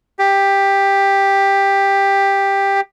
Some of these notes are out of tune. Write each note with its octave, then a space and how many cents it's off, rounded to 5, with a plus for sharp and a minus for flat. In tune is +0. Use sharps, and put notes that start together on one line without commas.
G4 +10